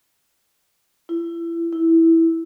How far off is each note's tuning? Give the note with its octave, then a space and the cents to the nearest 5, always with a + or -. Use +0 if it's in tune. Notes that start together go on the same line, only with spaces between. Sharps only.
E4 +25
E4 -5